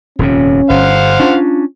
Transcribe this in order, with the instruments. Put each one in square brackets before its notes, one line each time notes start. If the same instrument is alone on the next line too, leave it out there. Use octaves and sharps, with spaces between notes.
[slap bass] D#1 F2 C3 [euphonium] C#4
[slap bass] G1 [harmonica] C5 F5 F#5
[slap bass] C#4 D4 [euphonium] F4